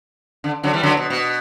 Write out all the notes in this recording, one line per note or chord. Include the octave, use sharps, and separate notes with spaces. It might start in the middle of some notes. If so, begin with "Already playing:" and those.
D3
D3 F#3
E3 G3
D3 F#3
B2
B2